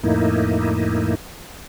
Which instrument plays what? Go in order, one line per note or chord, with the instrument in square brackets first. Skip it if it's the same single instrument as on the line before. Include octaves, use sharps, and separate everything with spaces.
[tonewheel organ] F2 A2 A#3 D#4 E4